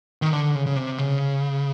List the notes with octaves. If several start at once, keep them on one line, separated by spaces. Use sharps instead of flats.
D#3
D3
C#3
C#3
C3
C#3